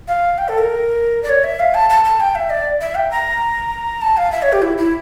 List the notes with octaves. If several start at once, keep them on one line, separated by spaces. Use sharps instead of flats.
F5
G5
A4
A#4
D5
C#5
E5
F5
A5
A5
A5
G5
E5
D5
E5
G5
A#5
A5
F5
E5
C#5
G4
E4
E4